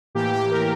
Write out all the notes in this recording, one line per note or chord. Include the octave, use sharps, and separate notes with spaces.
A2 E3 A#3 G4
G4
A#4